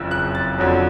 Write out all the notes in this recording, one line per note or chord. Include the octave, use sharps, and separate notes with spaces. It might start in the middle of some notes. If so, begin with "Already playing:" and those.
Already playing: F#1 F2 C#3 E3 E6 F#6
F#6
A6
F2 D3 F#3